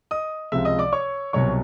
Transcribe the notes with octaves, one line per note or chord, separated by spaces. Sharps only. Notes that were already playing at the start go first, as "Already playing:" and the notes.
D#5 D#6
C#2 C3 F3 G#3 E5 E6
D#5 D#6
D5 D6
C#5 C#6
C2 B2 F#3 C#5 C#6